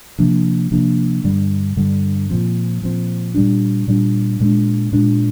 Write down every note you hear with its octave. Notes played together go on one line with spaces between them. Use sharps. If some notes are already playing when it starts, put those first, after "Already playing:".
C3 F3 A#3 D4
C3 F3 A#3 D4
G2 D3 G3
G2 D3 G3
A#2 F3 C4
A#2 F3 C4
A#2 G3 D4
A#2 G3 D4
A#2 G#3 D4
A#2 G#3 D4